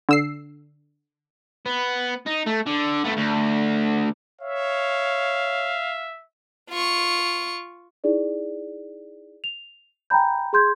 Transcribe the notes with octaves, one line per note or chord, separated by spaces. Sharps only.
D3 E6 C7
B3
D#4
A3
D3
A3 B3
D2
C#5 E5 F5
F4 C#6
D#4 E4 G#4 D5
F7
G5 G#5 A#5 B5 G6
G#4 C6 G6 G#6